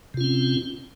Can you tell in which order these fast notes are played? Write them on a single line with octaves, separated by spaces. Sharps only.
C3 F4 C#4 C4